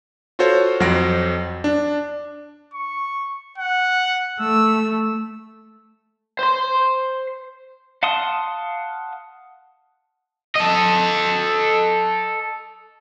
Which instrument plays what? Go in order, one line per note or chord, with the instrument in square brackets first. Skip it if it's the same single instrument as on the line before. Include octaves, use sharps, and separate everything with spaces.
[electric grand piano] F4 F#4 A4 C5 C#5
F2 F#3 C4 F#5 A#6 D7
D4
[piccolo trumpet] C#6
F#5
[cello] A3 [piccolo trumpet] E6
[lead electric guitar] C5 C6
[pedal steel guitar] F5 F#5 A5 C6 D#6
[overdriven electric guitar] A4 D#5